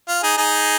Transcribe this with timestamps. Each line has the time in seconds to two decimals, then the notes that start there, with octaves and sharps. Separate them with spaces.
0.08 F4
0.22 D#4 G#4
0.37 D#4 G#4